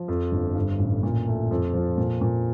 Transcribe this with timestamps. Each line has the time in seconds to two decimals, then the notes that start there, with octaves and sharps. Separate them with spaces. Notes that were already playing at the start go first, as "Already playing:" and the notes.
Already playing: F3
0.08 F2
0.32 G1
0.55 G2
0.79 A1
1.03 A#2
1.27 A3
1.51 F2
1.74 F3
1.98 A#2
2.21 A#2